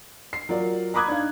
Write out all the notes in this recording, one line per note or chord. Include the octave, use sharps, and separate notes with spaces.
C7
F#3 F4 A#4 D5
A#5 B5 D6 D#6 F#6 G#6
D4 D#4 F5